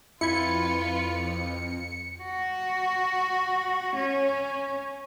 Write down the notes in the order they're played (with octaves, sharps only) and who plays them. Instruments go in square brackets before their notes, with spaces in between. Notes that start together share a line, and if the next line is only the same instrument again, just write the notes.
[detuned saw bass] F2 [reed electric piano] E4 B5 G#6 [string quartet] F4 B4 [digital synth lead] C#7
[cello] F#4
C#4